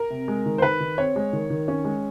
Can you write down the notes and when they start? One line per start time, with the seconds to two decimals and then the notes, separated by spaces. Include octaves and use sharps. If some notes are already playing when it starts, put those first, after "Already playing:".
Already playing: A#4
0.10 C3
0.28 G#3
0.46 D#3
0.58 C5
0.62 D#3 B4
0.80 D#3
0.98 C4 C#5
1.16 G#3
1.33 D#3
1.50 D#3
1.68 C#4
1.85 G#3